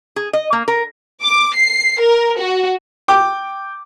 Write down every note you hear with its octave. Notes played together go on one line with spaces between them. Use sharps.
G#4
D#5
A#3
A#4
D6
C7
A#4
F#4
G5 D6